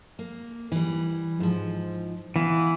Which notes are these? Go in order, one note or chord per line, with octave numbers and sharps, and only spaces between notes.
A#3
E3 G3
G#2 F3
E3 B3 F5